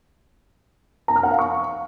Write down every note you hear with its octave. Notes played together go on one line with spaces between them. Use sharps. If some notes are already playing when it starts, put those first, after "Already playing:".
A#5
F6
F#5
F5
C#6